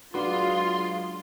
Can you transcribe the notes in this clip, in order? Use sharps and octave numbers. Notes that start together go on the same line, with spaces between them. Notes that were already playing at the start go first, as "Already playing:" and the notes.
F#3 G#3 D4 F4 F#4 B4 C6